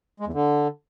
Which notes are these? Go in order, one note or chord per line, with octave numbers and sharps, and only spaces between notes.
G#3
E2
D3